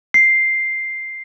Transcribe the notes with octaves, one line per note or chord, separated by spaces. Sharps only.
C7